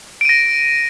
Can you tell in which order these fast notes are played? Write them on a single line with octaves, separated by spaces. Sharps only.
D7 D#7 A#6